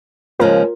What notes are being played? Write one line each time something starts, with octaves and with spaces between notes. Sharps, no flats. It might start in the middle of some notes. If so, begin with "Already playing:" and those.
D#2 C#3 F3 G#3 F4 A#4